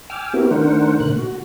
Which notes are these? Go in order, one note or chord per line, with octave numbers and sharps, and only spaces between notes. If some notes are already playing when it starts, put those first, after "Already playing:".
G5 G#5 D6 E6 F6
B3 C4 E4 F#4 G4 A#4
D#3 A3 D4 A#4 C5 F#5
A#2 D3 A3 F#6
F#4